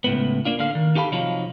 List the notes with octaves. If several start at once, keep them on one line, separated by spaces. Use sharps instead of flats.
C#2 A2 B3
A#3 D4 F4
D3 F5
D#3
D#4 G4 A4 F5 B5
C3 F3 F#3 D#4 F4